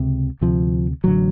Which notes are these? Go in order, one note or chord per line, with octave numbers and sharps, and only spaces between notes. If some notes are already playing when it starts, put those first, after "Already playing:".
Already playing: C#2 C3
D2 C3 F3
A1 D3 F#3